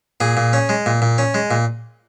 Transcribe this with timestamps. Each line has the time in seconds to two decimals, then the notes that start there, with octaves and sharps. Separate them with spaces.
0.20 A#2 G#4
0.37 A#2
0.53 C#4
0.69 G#3
0.86 A#2
1.02 A#2
1.18 C#4
1.34 G#3
1.51 A#2